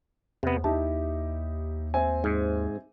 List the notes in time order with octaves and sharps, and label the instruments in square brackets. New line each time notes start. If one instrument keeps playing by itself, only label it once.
[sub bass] E2 [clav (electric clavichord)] C3 B3 [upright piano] C5
[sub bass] D#2 [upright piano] D#4 E4 G4 [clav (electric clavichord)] A5
[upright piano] C4 E5 G#5
[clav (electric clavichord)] G#2